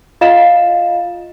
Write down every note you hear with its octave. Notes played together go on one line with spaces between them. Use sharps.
F4 D#5 F5 A6 E7